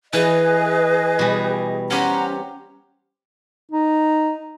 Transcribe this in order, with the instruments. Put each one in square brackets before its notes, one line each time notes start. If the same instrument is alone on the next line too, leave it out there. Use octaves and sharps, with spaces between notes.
[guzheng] E3 [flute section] G#4 D#5 [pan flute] B4
[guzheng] B2 G3
[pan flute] C#4 [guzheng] G4 C5 C#5 [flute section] F#5 A#5
[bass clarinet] D#4